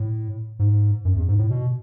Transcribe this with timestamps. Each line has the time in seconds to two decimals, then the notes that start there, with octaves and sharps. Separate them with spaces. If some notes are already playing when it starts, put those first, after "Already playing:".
Already playing: A2
0.59 G#2
1.05 F#2
1.16 E2
1.28 G#2
1.39 A2
1.50 B2